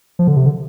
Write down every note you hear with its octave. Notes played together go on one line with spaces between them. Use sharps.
F3
D3
C3
D3